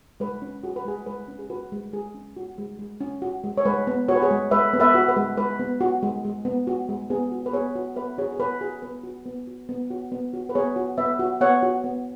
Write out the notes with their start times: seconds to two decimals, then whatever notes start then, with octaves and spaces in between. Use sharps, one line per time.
0.20 G#3 B4
0.42 C#4
0.64 F#4 G#4
0.76 B4
0.85 G#3 G#4
1.06 G#3 B4
1.28 C#4
1.39 G#4
1.50 F#4 B4
1.72 G#3
1.93 G#3 G#4
2.15 C#4
2.37 F#4
2.58 G#3
2.79 G#3
3.01 C#4
3.22 F#4
3.44 G#3
3.58 C#5
3.65 G#3 B4
3.87 B3
4.08 F#4 C#5
4.15 B4
4.22 G#4 C#5
4.31 G#3
4.51 G#3 B4 E5
4.73 B3
4.80 B4 E5
4.95 F#4
5.09 B4
5.17 G#3
5.37 G#3 B4
5.59 B3
5.81 F#4
6.02 G#3
6.25 G#3
6.45 B3
6.67 F#4
6.89 G#3
7.10 B3 G#4
7.32 F#4
7.46 B4
7.53 B3 G#4 C#5
7.75 F#4
7.96 B3 B4 E5
8.18 F#4 G#4 C#5
8.33 G#4
8.40 B3 B4
8.60 F#4 G#4
8.82 B3 B4
9.04 F#4
9.26 B3
9.47 F#4
9.69 B3
9.90 F#4
10.12 B3
10.34 F#4
10.49 B4
10.55 B3 G#4 C#5
10.76 F#4
10.98 B3 B4 E5
11.19 F#4
11.41 B3 C#5 F#5
11.62 F#4
11.84 B3